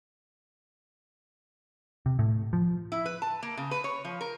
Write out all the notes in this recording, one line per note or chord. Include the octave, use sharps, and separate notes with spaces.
C3
A2
F3
E4
B4
A5
A#3
C#3
B4
C#5
F3
A#4